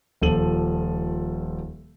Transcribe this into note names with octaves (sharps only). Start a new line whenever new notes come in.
D#1 F3 A4 D#7 F#7